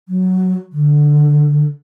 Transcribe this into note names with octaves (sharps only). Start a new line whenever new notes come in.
F#3
D3